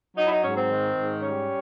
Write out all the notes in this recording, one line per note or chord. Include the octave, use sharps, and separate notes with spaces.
F#3 D#4
E4
D#4
G#2 C#4
C4
D#3
G#2
G3 C#4